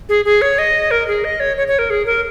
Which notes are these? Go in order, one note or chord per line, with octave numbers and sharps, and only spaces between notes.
G#4
G#4
C#5
D#5
A#4
G#4
D#5
C#5
C#5
C#5
A#4
G#4
A#4